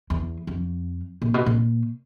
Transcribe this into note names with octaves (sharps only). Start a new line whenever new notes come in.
E2
F2
A#2
B2
A#2